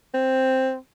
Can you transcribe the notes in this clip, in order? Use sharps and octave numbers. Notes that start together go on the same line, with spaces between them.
C4